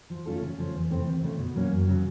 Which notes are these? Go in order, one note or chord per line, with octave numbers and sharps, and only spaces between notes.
F3
A3 C#4 F4 A4
C#3
F3 A3 C#4
E2
C3 E3 A3 C4
D#2
C#3 F3 A3
B2
F#3 A#3 C#4
F#2
C#3 F#3